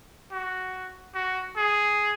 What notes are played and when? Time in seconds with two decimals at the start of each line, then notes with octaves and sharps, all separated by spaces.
0.32 F#4
1.14 F#4
1.57 G#4